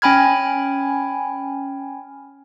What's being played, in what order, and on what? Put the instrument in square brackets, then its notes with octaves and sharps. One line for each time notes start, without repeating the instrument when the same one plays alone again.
[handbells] C#4 G5 G#5 B5 F6 G#6